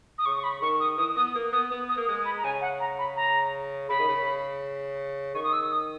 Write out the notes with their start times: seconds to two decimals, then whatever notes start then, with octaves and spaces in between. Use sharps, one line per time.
0.18 D#6
0.26 C#3 C#6
0.37 C#6
0.44 B5
0.62 D#3 C#6
0.80 D#6
0.98 E3 D#6
1.16 B3 D#6
1.35 A#3
1.52 B3 D#6
1.71 B3
1.89 D#6
1.97 A#3
2.07 G#3 D#6
2.25 B5
2.38 A#5
2.44 C#3 G#5
2.61 F#5
2.80 A#5
2.98 B5
3.16 A#5
3.89 C#3 B5
3.99 D#3
4.08 C#3
5.35 D#3 C#6
5.44 D#6
5.53 E6
5.71 D#6